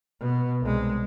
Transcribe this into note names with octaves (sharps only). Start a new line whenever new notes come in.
B2
C2 G#3